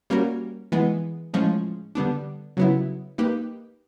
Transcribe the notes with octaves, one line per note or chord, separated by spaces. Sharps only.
G3 A#3 C#4 F#4 A#4
E3 G#3 B3
A2 F3 G#3 C#4
D3 G3 B3 D4
C#3 F#3 B3 E4
A#3 D#4 G4 B4